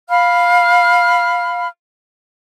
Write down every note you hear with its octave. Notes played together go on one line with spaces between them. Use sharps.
F5 B5 F6